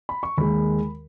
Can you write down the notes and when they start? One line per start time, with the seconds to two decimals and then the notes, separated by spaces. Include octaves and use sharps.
0.09 B5
0.23 C#6
0.37 D#2 D#3 G#3 B5